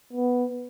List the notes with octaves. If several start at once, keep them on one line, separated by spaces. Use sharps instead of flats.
B3